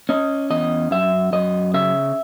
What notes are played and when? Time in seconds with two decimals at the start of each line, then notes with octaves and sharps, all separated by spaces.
0.09 C#4 D#5
0.50 E2 D#5
0.91 F#2 E5
1.33 F#2 D#5
1.74 C#3 E5